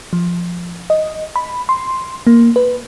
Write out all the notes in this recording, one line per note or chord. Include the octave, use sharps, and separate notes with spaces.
F3
D#5
B5
C6
A#3
B4